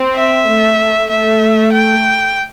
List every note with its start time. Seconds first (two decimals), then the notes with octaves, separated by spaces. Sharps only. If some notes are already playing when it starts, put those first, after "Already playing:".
Already playing: C4
0.15 E5
0.47 A3
1.10 A3 E5
1.72 G5